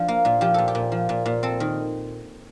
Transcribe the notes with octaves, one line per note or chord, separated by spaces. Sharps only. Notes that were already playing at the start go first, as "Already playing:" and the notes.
Already playing: F3 D4
A#3
A#2
F3 G4
A#2 A4
G4
A#2
F3
A#2
A#2
C4 A4
D#3